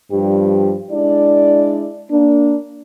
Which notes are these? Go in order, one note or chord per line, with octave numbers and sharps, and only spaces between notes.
G2 F3 G3 G4
G#3 D4 E4 D5
A#3 D4